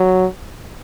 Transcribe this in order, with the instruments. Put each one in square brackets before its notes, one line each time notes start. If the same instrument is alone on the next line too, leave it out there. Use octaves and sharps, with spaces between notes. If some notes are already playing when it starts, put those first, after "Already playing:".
Already playing: [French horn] F#3